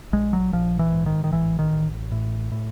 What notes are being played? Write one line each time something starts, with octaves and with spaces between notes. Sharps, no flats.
A#1 G#3
F#3
A#1 F3
E3
G#2
D#3
D#3
A1 E3
D#3
A1
A2
A2